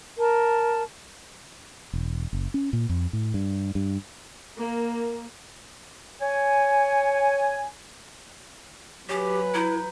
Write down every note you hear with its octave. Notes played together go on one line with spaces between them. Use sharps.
A#4 A5
E1
F#1
C#4
A#2
F2
A2
G2
G2
A#3
C#5 G#5
F#3 G4 B4 C#5 G#5
E4 A#5 G6